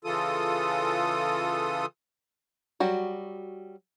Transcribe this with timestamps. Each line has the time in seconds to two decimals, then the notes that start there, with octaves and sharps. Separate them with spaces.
0.04 C#3 E3 F4 A4 D#6
2.80 F#3 G3 F#4